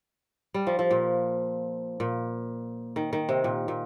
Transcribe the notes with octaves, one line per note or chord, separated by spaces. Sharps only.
G3
F3
F3
A#2
A#2
D#3
D#3
C3
A#2
A#2